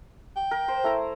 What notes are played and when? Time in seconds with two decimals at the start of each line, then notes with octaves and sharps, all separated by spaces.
0.36 G5
0.51 A#4
0.68 C5
0.84 A3 E4 A#5